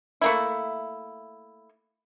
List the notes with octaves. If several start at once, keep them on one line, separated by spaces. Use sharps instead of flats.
A3 A#3 E4